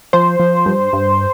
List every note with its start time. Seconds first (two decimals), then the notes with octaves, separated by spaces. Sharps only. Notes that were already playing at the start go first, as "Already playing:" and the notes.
0.13 F3 C5
0.40 F3
0.66 G2
0.93 G2